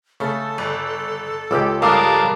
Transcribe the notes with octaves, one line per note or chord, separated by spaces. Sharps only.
C#3 A3 A4
G1
C#2 G#3 G4 D6 E6
G2 A#4 F5 A5 D6 D#6